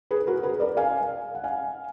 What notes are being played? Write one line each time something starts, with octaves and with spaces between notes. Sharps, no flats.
G#4 B4
F#4 A#4
G#4 B4
A#4 D5
F5 G#5
F#5
F5 G#5